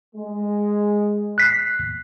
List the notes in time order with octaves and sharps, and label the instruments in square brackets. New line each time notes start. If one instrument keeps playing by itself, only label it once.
[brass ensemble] G#3
[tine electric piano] F#6 B6 C7